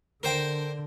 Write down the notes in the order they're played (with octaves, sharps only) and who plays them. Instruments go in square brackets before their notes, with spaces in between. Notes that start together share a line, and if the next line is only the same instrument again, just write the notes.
[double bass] D3 [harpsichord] A#4 C5 G5